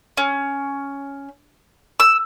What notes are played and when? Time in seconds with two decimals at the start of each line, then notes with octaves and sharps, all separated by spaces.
0.17 C#4
2.00 E6